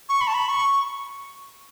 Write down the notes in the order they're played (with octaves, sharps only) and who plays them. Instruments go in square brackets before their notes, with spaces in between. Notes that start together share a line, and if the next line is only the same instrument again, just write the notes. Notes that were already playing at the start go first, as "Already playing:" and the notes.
[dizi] C#6
B5
A5
B5
C#6